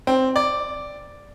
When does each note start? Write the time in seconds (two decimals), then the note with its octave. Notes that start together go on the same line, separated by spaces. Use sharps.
0.07 C4
0.36 D5